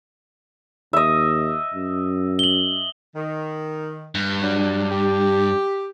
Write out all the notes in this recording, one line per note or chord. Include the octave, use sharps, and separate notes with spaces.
D#2 D#5 E5
F#2
F#7 G7
D#3
G2
F#3 D4
G4